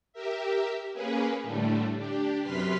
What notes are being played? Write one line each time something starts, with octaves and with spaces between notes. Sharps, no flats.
G4 A#4 E5
A#3 C#4 G#4 B4
A2 D3 G3 A3
D4 G4
F#2 C3 B4 C6 F6 B6